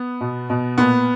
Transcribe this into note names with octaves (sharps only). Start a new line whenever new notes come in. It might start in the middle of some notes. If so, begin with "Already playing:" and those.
Already playing: B3
B2
B2
A#2 B3